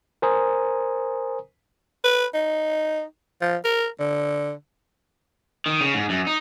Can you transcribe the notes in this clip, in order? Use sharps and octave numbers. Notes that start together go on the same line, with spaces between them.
A#4 C5 G#5 A#5 D#6
B4
D#4
F3
A#4
D3
D#3
C#3
G#2
F#2
D#4